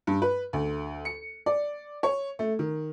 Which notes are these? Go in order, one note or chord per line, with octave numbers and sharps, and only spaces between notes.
G2
B4
D2
C#7
D5
C#5
A3
D#3